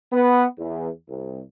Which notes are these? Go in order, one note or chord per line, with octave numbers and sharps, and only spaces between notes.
B3
E2
C2